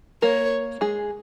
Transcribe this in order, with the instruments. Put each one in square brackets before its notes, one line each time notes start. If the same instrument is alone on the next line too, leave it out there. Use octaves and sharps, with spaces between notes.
[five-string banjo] A#3 A#4 [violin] C#5
[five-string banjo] G#3 G#4